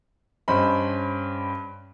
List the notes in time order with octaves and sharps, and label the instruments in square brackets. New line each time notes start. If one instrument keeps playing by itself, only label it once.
[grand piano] G2 C#4 C5 D#5 B5